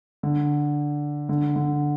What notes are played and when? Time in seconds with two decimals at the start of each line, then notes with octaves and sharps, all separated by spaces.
0.23 D3
1.29 D3
1.56 D3